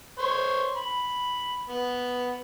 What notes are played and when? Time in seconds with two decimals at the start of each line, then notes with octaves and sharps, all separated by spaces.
0.19 C5 C#5
0.77 B5
1.70 B3